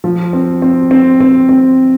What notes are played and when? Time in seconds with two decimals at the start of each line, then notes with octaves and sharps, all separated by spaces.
0.04 F3
0.33 C4
0.62 C4
0.91 C4
1.20 C4
1.49 C4